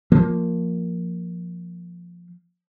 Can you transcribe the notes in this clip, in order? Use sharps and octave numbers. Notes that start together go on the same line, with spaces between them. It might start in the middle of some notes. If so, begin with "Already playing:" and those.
F3 A#3